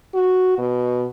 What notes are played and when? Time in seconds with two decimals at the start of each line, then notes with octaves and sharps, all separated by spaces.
0.14 F#4
0.58 B2